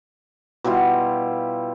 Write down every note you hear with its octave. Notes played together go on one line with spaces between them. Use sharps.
B2 G3 E4 F4